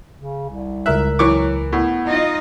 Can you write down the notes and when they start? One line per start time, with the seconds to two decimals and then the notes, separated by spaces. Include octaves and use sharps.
0.16 C#3
0.50 C2
0.86 C#2 A#4 E5 F#6
1.19 E3 F#3 C#6 D6
1.73 A2 B3
2.07 D#4 F4 D#5